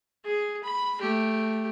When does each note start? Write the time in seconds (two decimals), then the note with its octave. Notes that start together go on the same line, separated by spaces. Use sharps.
0.24 G#4
0.63 B5
1.00 A3 G4